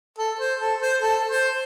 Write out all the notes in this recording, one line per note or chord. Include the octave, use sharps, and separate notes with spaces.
A4
C5
A4
C5
A4
C5